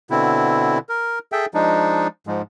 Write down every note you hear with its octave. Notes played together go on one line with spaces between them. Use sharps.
B2 D3 C4 E4
A#4
G#4 A4 E5 G5
F3 G#3 D4 D#4
G#2 F3 G#3